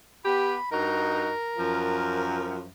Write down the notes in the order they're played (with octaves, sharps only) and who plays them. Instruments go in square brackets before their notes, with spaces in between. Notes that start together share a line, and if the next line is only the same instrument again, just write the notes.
[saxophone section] B3 G4 [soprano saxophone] B5
[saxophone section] G2 D#4 F#4 [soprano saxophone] A#4
[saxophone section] F#2 F3